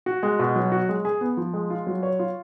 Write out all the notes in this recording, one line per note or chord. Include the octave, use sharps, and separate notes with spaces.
F#4
G#3
B2
F#3
F#4
G#3
G#4
B3
F3
G#3
F4
F#3
C#5
F4